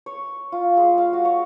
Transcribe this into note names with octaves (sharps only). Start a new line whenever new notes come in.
C#5
F4
G#3
F5
F#4
C#5